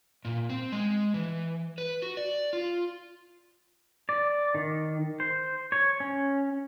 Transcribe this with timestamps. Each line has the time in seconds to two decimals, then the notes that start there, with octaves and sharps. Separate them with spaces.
0.25 A#2
0.50 C4
0.72 G#3
1.14 E3
1.78 B4
2.02 F#4
2.17 D5
2.53 F4
4.09 D5
4.55 D#3
5.20 C5
5.72 C#5
6.00 C#4